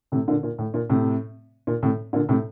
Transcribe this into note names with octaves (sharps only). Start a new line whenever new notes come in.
A2 C3
A#2 D3
A#2
A2
A#2
A2 C3
A#2
A2 C3
A#2 D3
A2 C3